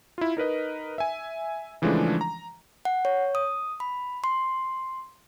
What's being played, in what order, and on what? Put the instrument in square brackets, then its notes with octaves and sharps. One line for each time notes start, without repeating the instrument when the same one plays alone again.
[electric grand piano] E4 F4
D#4 A#4 B4 D#5
E5 G#5
C#3 E3 F3 G#3 A3 D4
A#5
[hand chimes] F#5
C#5
D#6
B5
C6